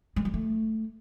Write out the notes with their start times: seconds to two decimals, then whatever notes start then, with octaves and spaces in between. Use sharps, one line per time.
0.16 G#3
0.25 G3
0.34 A3